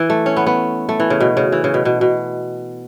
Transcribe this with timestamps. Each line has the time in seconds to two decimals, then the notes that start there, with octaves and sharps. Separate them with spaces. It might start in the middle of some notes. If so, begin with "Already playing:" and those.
Already playing: E3
0.10 A3
0.26 C#4
0.36 B3
0.46 B3
0.89 A3
1.00 E3
1.10 C#3
1.20 B2
1.37 C#3
1.52 E3
1.64 C#3
1.74 B2
1.85 B2
2.01 B2